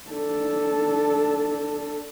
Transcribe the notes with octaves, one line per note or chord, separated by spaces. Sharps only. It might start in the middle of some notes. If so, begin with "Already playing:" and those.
D4 A4